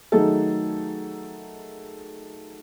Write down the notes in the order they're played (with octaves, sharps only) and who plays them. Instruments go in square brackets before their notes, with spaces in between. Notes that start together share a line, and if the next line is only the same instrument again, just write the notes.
[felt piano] D#3 F#3 A3 D#4 G#4 A4